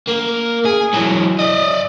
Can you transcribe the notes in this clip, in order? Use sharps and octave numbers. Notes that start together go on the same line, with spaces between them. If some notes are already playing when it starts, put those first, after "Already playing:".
A#3
G#4
E3 F#3
D5 D#5